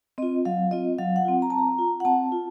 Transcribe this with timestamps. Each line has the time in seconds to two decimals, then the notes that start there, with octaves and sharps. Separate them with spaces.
0.18 C4 F4 D#5
0.45 F#3 F5
0.71 C4 F4 D#5
0.98 F#3 F5
1.16 F#5
1.25 C4 F4
1.42 A#5
1.50 C4 A5
1.58 A#5
1.78 F4
2.00 F#5
2.05 C4 A5
2.32 F4